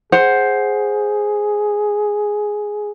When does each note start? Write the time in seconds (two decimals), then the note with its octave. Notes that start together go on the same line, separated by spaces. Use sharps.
0.12 G#4 C5 F#5